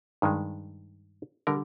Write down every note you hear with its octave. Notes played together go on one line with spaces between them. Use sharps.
G2 D#3 G#3
D3 G3 A#4